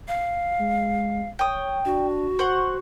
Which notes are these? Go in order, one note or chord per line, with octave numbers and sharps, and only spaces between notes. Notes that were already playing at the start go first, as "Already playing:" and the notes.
F5
G#3
C#5 G5 D#6
D4 F#4
C5 F#5 C#6